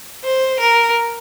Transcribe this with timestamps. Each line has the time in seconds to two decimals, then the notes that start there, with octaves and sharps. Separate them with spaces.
0.24 C5
0.60 A#4